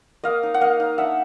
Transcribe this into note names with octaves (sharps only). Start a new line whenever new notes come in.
A#3 D#5 F5
D#4
F#5
A#3 D#5 F5
D#4
D4 E5 F#5